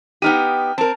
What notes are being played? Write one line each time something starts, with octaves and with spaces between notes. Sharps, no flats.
B3 D#4 G4 G5 F6 D#7
C4 A#4 A5